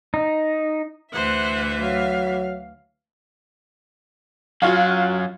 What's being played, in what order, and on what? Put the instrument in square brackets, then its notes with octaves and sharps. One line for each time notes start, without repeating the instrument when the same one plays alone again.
[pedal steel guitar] D#4
[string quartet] D2 E3 E5 [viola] C5 F#5
[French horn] F#3 [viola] F5
[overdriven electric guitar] F#2 F#3 [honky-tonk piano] F4 F#4 F5